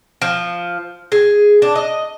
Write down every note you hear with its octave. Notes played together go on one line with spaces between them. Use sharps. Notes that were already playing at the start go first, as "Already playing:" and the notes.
F3
G#4
D4
D#5